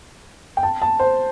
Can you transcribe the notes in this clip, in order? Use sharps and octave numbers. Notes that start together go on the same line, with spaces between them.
G5
A5
A5
C5